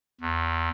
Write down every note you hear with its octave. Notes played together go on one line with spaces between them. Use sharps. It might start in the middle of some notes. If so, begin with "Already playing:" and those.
E2